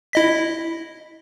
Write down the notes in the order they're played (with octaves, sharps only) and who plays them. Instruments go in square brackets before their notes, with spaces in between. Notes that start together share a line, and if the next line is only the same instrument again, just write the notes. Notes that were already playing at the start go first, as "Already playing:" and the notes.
[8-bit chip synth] E4 D#5 B6